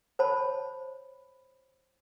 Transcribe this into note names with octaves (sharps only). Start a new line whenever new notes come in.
C5 C#5 A5 B5